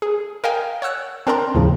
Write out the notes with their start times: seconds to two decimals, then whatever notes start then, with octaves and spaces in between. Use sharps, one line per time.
0.02 G#4
0.44 A#4 D#5 F5 G5 G#5
0.82 C#5 F#5 E6 F#6
1.27 C4 D4 A#4 D5 A#5 C6
1.55 D#2 A2 C#3 F3